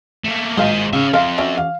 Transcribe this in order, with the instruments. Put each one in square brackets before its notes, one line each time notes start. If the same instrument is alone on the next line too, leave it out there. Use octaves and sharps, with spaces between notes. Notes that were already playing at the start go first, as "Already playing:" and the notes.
[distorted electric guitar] A3 A#3
[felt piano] G#1 [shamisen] G#3 A#3 F4 [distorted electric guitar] G#4 C5
[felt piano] C#3 [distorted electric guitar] C#5 E5
[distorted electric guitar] F2 [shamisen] A#4 E5 F5 [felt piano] C6
[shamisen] C#4 F#4 D5 [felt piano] E5
[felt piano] F5